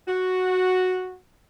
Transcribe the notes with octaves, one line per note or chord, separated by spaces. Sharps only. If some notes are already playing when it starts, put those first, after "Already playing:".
F#4